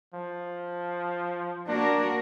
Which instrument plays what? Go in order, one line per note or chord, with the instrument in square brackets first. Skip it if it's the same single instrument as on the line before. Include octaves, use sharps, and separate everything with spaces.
[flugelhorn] F3
[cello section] A#3 F#4 A#4 [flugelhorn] D4